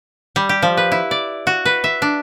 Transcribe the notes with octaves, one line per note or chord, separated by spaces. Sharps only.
G3
G4
F3
B4
E4
D5
F#4
B4
E5
D4